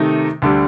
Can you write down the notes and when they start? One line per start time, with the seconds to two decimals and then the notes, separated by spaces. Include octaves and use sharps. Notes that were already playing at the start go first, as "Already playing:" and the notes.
Already playing: C3 D#3 A3 D#4
0.42 D2 D3 G3